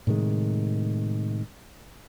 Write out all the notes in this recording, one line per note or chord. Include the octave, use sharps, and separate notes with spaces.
A2 C3 D#3 G#3